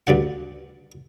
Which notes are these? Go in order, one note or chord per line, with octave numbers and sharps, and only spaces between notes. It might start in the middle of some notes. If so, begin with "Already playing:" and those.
D2 G2 D3 F#5